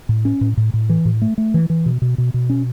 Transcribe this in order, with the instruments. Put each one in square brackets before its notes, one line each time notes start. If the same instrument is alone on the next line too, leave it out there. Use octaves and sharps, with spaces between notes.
[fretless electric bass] A2
C#4
A2
A2
A2
E3
A2
A3
A3
E3
E3
B2
B2
B2
B2
C#4